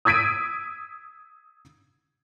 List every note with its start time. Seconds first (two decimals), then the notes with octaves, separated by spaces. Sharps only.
0.05 D#6 E6 G#6 B6 D7 D#7